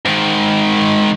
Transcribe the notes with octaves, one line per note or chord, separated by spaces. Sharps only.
G#2 D#3